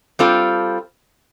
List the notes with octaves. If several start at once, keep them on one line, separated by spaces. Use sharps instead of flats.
G3 C4 F4 A4